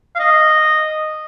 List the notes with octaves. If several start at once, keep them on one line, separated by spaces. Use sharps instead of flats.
F5
D#5